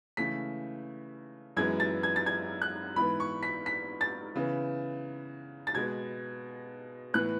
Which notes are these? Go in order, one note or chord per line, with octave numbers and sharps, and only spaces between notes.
C#3 E3 A3 B6
F#2 E3 G#3 B3 G#6
A6
G#6
A6
G#6
F#6
G#2 E3 B3 B5
C#6
B6
B6
A6
C#3 E3 B3
A6
B2 G#3 B3 G#6
A2 E3 B3 F#6